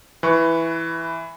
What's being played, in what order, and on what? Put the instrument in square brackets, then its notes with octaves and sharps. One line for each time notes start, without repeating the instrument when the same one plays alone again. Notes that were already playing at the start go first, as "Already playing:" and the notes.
[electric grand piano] E3 B4 C#6